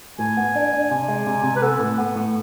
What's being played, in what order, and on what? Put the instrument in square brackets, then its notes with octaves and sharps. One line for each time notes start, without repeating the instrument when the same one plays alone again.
[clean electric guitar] A2 [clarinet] G#5
[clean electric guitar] B3
D4
D4
[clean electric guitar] C3 [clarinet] G#5
[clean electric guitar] G#3
C3
C3
[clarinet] B4
[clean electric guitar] B3 [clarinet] A4
[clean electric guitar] A2
B3
A2